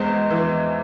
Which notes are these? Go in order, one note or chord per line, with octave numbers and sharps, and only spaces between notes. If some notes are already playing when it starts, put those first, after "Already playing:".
Already playing: E2 G#3 C5
E3